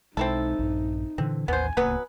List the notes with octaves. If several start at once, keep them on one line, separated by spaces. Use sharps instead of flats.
B1 G#3 C4 D#4 E4 A4
A#1 G2
A#2 D3 E3 C4
A1 D#2 B3 C5 G#5
D1 C#2 F#3 A#3 B3 B4